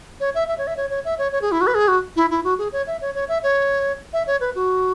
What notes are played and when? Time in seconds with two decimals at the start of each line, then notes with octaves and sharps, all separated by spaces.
0.20 C#5
0.35 E5
0.48 E5
0.58 C#5
0.67 E5
0.77 C#5
0.90 C#5
1.05 E5
1.18 C#5
1.32 C#5
1.42 G#4
1.52 E4
1.61 F#4
1.67 B4
1.75 G#4
1.88 F#4
2.16 E4
2.31 E4
2.44 F#4
2.58 G#4
2.73 C#5
2.87 E5
3.01 C#5
3.15 C#5
3.29 E5
3.43 C#5
4.13 E5
4.27 C#5
4.41 B4
4.55 F#4